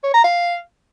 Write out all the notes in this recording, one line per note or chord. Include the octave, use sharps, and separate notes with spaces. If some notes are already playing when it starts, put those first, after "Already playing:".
C#5
A#5
F5